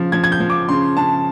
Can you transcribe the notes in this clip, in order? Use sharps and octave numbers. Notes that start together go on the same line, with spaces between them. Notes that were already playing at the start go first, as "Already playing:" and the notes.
Already playing: C#3 F3
F3 G#6
G#6
G6
F3
D6
C#3 C6
C#3 A5